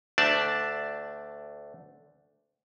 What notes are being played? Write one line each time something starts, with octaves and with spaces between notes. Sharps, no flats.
D2 A3 D4 D5 A5